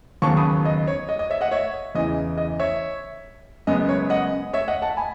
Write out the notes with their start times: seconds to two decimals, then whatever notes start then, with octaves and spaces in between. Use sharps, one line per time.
0.22 D#2 C#3 F#3 B3 A5 C#6
0.37 B5 D#6
0.65 D#5
0.87 C#5
1.09 D#5
1.19 D#5
1.30 C#5 E5
1.41 D#5 F#5
1.51 C#5 E5
1.95 E2 C#3 E3 D#5
2.38 D#5
2.59 C#5 E5
3.67 F#2 C#3 G#3 B3 D#5
3.89 C#5
4.10 D#5 F#5
4.53 C#5 E5
4.68 D#5 F#5
4.82 F#5 A5
4.97 G#5 B5